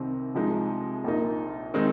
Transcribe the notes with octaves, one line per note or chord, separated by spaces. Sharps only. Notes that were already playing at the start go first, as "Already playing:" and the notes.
Already playing: C2 C3 D#3 C4 D#4
C2 C3 F3 G#3 D#4
A#1 A#2 A#3 D#4
D#3 G#3 C4 D#4